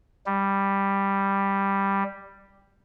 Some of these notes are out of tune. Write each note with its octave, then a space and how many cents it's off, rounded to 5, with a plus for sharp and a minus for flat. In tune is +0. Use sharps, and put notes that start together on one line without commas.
G3 +5